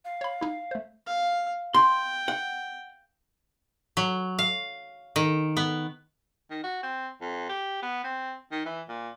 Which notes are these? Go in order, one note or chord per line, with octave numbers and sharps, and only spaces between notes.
F5
C#5 B5
D#4 E4
A3 C5
F5
G5 C6
F#5
F#3
F5
D#3
B3
D#3
F#4
C4
F2
G4
B3
C4
D#3
E3
A#2